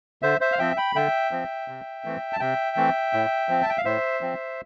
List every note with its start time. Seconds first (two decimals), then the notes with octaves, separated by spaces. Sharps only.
0.22 D3 C5 E5
0.41 C5 E5
0.52 F5
0.59 F3 C4 E5 G5
0.77 G5 B5
0.95 D3 E5 G5
1.31 F3 C4
1.68 C3
2.05 E3 A3 C4
2.33 A5
2.40 C3 E5 G5
2.77 E3 A3 C4
3.13 A2
3.48 F3 C4
3.63 A5
3.70 G5
3.78 F5
3.85 A2 C5 E5
4.21 F3 C4